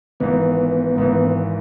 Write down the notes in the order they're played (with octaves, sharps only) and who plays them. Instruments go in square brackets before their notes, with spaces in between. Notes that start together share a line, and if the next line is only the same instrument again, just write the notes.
[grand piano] G#1 G#2 E3 [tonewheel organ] B3
[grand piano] G#1 G#2 E3